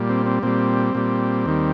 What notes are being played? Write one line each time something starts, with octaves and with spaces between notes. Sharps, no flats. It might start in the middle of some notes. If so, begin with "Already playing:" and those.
Already playing: A#2 G3
C4
C4
A#2 G3 C4
A#2 G3
D#2 D#3 G3